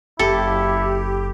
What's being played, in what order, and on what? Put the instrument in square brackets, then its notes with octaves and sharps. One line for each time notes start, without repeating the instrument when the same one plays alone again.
[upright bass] F#1 [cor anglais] E4 [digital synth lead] G4 [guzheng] A4